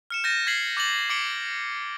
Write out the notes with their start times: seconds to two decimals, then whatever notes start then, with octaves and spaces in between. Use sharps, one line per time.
0.10 F6 C#7 E7
0.24 F6 G6 A6 A#6 D#7
0.47 G#6 B6 C7 F#7
0.77 D6 G6 A6 F#7
1.10 D6 G#6 C#7 D7 F#7 G7